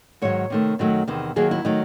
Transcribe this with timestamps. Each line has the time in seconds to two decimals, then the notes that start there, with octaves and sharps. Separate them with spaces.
0.22 G#2 D#3 F#3 C#5
0.50 C3 D#3 A3
0.79 F#2 D#3 F#3 A3
1.08 E2 C3 D#3
1.36 D#2 D#3 F#3 G#4
1.51 E4
1.65 D#3 F#3 A3 D#4